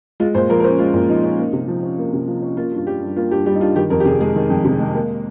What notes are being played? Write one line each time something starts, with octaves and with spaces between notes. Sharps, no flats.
G#3 F4
A#2 C5
F3 A#4
A#4
C#4 C5
G#3 F4
A#2
F3 D#4
C#4
A#3
C3
F3
C#4
A#3
C3
F3
C#4
A#3 F4
G2 F4
G3 G4
G2
A#3 F4
G2 G4
G3 G4
D#4
G2 F4
D#3 G4
F2 A#4
G4
C3 G#4
G#3 G#4
D#3
F2
C3
G#3
A#3